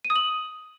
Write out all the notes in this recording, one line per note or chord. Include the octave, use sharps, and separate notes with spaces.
D#7
D#6
F#7